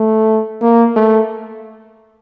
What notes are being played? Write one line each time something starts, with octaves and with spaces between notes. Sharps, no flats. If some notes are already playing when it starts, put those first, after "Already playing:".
Already playing: A3
A#3
A3